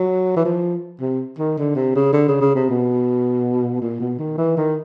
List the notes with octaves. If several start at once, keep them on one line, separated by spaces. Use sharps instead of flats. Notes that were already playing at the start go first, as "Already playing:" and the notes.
Already playing: F#3
E3
F3
C3
D#3
D3
C3
C#3
D3
C#3
C#3
C3
B2
A#2
B2
D#3
E3
D#3